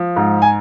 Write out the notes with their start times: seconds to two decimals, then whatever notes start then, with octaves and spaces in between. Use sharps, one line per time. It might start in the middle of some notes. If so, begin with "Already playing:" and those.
Already playing: F3
0.16 G#2
0.42 G#5